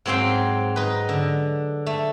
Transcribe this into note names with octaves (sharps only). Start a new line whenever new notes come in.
G#2 F#3 C4 F5 G5
D#4 B4
D3
A3